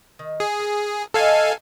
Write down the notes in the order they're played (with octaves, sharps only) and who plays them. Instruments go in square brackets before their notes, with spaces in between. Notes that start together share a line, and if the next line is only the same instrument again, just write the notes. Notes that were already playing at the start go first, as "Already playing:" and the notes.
[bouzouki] D#3
[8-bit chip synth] G#4
[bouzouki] A#4
[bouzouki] D#3 B4 D#5 [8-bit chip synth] A4 F5 G#5